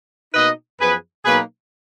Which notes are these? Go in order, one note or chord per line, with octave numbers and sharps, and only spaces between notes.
B2 A#3 D#4 B4 D#5
F#2 F3 B3 G#4 B4
B2 F#3 A#3 D#4 G#4 B4